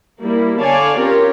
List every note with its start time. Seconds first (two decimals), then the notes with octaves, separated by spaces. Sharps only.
0.21 G3 A#3 E4
0.60 D3 C#5 D5 F5 G#5 A5
0.99 C4 C#4 F4 G4 A#4 C#5